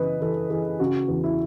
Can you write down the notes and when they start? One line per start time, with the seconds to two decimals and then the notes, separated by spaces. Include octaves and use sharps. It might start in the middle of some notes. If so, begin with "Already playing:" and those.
Already playing: C#3 E3 B4 D#5
0.21 E3 A4
0.50 E3 G#4
0.80 C#3 F#4
1.08 E2
1.24 E4